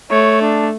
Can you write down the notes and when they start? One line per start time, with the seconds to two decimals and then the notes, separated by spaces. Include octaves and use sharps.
0.11 A3 C#5
0.41 D4